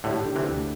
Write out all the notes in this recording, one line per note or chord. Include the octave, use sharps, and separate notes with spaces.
A2 D3 G4
D3
C3 E3
D2